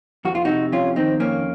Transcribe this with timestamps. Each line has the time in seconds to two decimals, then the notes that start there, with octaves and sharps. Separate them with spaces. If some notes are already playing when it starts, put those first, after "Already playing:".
0.25 F2 F#4
0.35 F4
0.45 C3 D#4 F#4
0.72 F2 C#4 F4
0.96 D#3 C4 D#4
1.20 F2 A#3 C#4